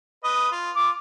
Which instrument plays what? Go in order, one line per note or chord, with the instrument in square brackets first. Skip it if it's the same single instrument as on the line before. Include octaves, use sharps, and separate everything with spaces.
[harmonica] B4 D#5
F4
[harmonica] F4 [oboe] D6